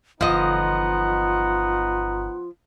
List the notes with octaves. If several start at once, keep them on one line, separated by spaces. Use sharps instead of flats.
G1 E3 F3 B3 D#4 F4 D#5 F#5